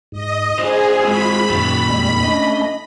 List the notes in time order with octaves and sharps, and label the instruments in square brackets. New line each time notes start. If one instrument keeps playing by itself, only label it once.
[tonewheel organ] G#2 [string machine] D#5
[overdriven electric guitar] D4 C5 [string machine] G#4 [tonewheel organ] G#5
[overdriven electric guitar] G#3 C4 [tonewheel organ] F4 F#4 [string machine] B5
[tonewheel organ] F#2 F#4 A6 [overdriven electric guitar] A#2 D#3
[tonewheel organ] F2 G3 G#3
[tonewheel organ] A3 C#4 D4 [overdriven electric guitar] D#5